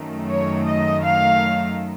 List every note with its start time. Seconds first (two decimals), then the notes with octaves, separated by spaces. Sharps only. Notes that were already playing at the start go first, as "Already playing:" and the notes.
Already playing: F#2 D#3 A3
0.29 C#5
0.67 D#5
1.03 F5